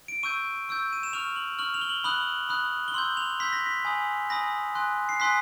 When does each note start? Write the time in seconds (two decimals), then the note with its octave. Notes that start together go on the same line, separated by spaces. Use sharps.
0.08 D7
0.23 C#6 E6 G6 D#7
0.69 C#6 E6 G6
0.93 D#7
1.03 E7
1.13 C#6 F6 F7
1.36 F#7
1.59 C#6 F6 F#7
1.74 F7
1.81 G7
1.89 F#7
2.04 B5 D#6 F#6 F#7
2.49 B5 D#6 F#6
2.88 G7
2.94 C6 E6 G6 F#7
3.17 F7
3.39 C6 E6 G6 B6
3.53 A#6
3.66 B6
3.85 G#5 B5 D#6
4.30 G#5 B5 D#6 A#6
4.75 G#5 C6 D#6 F#6
5.09 C7
5.20 G#5 C6 D#6 F#6 B6